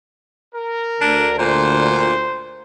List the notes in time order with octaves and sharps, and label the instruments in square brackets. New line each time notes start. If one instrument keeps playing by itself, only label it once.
[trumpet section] A#4
[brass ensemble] D2 D3 [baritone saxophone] D4
[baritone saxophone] A#2 [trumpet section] C5